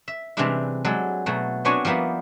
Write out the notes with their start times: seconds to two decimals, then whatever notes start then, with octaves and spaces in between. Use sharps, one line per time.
0.08 E5
0.37 C3 E3 G3 G#3 D4 E4
0.85 F#3 G#3 A4 D5
1.26 B2 F#3 A3 A#5
1.65 B3 C4 D4 F#4 C#5 G#5
1.85 F3 G3 A#3 B3 E4